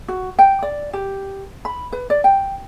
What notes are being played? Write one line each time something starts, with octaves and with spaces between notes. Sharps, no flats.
F#4
G5
D5
G4
B5
B4
D5
G5